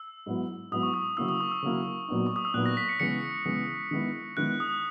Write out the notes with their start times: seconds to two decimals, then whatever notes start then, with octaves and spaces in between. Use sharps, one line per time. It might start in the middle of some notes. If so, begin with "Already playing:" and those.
Already playing: E6
0.26 G#2 F#3 B3 E4
0.71 G#2 F#3 B3 E4 D#6
0.83 C#6
0.94 D#6
1.17 C#3 F#3 A#3 E4 E6
1.29 D#6
1.41 C#6
1.52 E6
1.62 C#3 F#3 A#3 E4
2.08 A#2 F#3 B3 D#4
2.27 C#6
2.36 D#6
2.45 E6
2.54 A#2 F#3 B3 D#4 F#6
2.66 A#6
2.77 B6
2.89 C#7
3.00 C#3 E3 G#3 B3 C#7
3.45 C#3 E3 G#3 B3
3.91 D#3 G#3 B3 E4
4.37 D#3 G#3 B3 E4 F#6
4.60 D#6